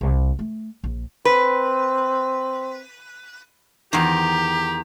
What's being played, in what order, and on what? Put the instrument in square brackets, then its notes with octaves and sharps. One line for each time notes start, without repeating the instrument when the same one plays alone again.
[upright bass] C2
A3
A#1
[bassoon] C4 [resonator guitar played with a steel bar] B4
[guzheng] E2 C5 [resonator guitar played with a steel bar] D#3 [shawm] G4 [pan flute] A#5